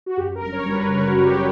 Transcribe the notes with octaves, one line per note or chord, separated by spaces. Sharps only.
F#4
F#2 G4
A#4
G1
C#5
G3
B4
C#3 A#4
F#4
F#2
G4